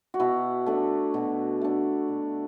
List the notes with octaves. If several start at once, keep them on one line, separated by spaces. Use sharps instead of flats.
F#4
B2 E4
A3 D4
B2
A3 D4
B2